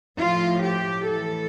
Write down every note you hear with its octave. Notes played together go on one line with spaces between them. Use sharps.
A2 F3 F4
G4
A2 E3 A4